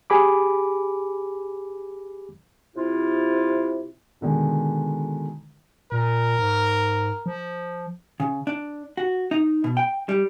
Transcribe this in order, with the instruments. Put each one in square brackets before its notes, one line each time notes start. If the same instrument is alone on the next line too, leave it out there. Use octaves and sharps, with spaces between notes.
[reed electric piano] G4 G#4 B5 D6
[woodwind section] C3 E4 F4
[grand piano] B2 D3 D#3 G#3
[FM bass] A#2 [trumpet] A#4
[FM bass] G#2
F3
[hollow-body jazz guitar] C#3
D4
F#4
D#4
B2
G5
G3